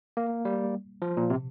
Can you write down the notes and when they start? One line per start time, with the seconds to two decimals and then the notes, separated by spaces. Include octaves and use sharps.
0.17 A#3
0.45 G3
1.02 F3
1.17 A#2
1.30 C3